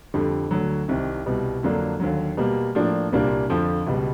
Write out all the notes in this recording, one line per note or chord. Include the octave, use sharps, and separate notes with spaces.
F2 D3 G3
D2 D3 F#3
C2 C3 D#3
C2 B2 G3
F2 D3 F#3 A#3 D4
D#2 D3 F#3
B2 G3 A#3
A2 F3 A#3 D4
C2 A#2 G3 A#3 D4
F2 D3 F3
C#2 B2 G3